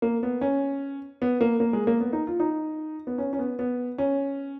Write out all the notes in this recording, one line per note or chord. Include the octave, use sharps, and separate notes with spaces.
A#3
B3
C#4
B3
A#3
A#3
G#3
A#3
B3
D#4
F4
D#4
B3
C#4
C#4
B3
B3
C#4